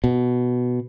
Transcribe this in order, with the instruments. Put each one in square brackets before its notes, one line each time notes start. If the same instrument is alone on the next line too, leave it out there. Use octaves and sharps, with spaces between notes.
[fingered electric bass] B2